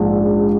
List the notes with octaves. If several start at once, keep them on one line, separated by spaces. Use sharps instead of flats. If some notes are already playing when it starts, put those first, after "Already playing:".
Already playing: A#1 G#2 G#3 F4